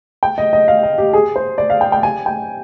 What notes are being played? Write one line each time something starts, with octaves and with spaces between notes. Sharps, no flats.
G5
D#5
D#5
F5
D#5
G4
G#4
C5
D5
F5
G5
G5
G#5
G5